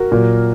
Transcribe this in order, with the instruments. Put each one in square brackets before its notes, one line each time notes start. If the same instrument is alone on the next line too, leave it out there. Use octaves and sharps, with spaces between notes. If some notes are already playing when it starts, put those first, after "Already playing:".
Already playing: [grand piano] F#4 A#4
A#2 F#3 A#3